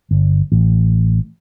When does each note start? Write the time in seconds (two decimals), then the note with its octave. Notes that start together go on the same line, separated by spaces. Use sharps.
0.11 G1
0.52 A1